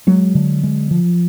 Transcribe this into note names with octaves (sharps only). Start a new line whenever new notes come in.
F#3 G#3
D3
G#3
F3